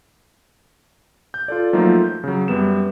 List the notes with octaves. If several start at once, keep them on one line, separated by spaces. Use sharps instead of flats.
G6
F4 A4 D5
F3 F#3 A3 A#3 D#4 F4
G6
C#3 F#3
F#2 G3 B3 E7